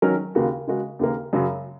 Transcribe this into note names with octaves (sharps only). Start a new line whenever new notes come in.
D#3 F#3 C#4 A#4
D#2 C#3 A#3 F#4
C#3 G#3 F#4 A#4
D#2 C#3 A#3
F#2 C#3 F#3